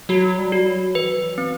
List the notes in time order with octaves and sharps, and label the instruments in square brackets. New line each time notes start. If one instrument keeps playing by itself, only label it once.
[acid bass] F#3 [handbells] F#4
[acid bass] G3
[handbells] F#4
[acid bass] F#3
[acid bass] E3 [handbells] B4
[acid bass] F#3
E3
[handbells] C4